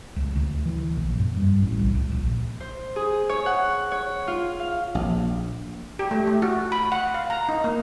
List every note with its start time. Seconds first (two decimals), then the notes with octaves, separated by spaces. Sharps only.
0.16 C#2
0.36 D2
0.66 E3
0.97 A#1
1.18 F#2
1.37 G2
1.62 A1
1.79 C2
1.95 C#2
2.12 A#1
2.60 C5
2.96 G#4
3.29 C#5
3.46 F#5
3.92 C#5
4.28 F4
4.60 F5
4.95 A#1
5.99 G4
6.11 A3
6.27 A3
6.42 F#4
6.72 B5
6.92 F#5
7.14 F5
7.30 A#5
7.49 D#4
7.64 A#3